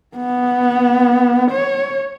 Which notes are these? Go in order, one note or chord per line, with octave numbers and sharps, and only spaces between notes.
B3
C#5